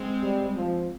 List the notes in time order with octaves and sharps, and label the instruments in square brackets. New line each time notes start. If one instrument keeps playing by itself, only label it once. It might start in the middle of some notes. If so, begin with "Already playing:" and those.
Already playing: [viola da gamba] G#3 C4
[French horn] G3
F3